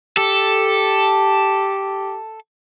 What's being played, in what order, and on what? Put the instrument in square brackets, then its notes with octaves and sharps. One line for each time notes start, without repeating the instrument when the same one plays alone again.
[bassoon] G4 [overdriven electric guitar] A4